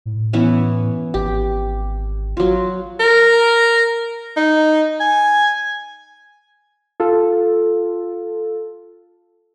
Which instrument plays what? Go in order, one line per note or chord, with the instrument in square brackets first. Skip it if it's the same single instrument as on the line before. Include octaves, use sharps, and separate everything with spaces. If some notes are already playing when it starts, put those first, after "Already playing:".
[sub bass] A2
[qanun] E3 B3 C#4
[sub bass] G#1 [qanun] G4
[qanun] F#3 F4
[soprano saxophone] A#4
D#4
G#5
[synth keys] F4 A4